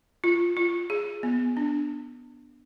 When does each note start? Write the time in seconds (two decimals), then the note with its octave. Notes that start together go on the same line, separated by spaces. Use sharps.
0.24 F4
0.57 F4
0.90 G#4
1.23 B3
1.57 D4